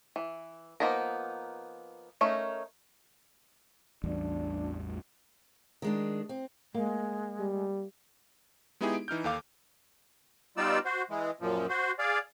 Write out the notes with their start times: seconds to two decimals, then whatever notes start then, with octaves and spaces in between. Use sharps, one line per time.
0.16 E3
0.80 F3 A#3 B3 D#4 A#4
2.21 A3 C#4 D#4 A#4
4.04 A1 E2 G3 D4
5.82 D#3 G#3 D4
6.29 C4
6.74 G#3 A#3
7.39 G3
8.81 G#3 B3 D#4 E4 G4 G#4
8.94 D7
9.08 E3 D#4 F6 G6
9.24 D#2 A4 F5 D6
10.57 G3 B3 D#4 F4 D5 E6
10.85 F#4 C5
11.10 E3 G#3
11.41 F#2 A#2 F3
11.69 F#4 C5
11.99 G#4 D5 F5